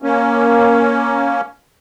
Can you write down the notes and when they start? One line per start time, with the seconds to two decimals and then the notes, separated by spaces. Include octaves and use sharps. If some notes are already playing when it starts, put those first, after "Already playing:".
0.02 A#3 C#4